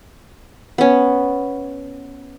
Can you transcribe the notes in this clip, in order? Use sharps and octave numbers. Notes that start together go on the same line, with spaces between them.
B3 C#4